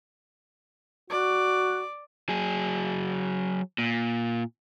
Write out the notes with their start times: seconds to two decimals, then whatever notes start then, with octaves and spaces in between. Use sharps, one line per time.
1.10 F#4 D5
2.29 F#3 G#4
3.78 A#2